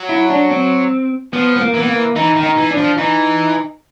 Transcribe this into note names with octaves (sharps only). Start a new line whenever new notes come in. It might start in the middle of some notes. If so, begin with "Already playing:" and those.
Already playing: F#3
E4
D4
C4
F3 B3
B3
A#3
E3
B3
A#3
E3 D#4
D#3
D#4
E3
D4
F3
E3 D#4